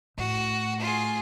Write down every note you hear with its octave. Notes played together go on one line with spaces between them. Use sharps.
A2 F#4
F4 G#4